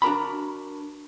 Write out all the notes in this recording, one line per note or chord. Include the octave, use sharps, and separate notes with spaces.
D4 F#4 A#4 A#5 B5